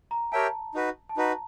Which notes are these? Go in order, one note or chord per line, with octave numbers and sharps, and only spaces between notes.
A#5
G4 A#4 C#5 E5 G5 A5
D#4 F#4 B4
A5
D#4 F#4 B4 A#5